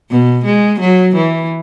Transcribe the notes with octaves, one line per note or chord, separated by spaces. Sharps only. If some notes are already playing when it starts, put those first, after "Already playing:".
B2
G#3
F#3
E3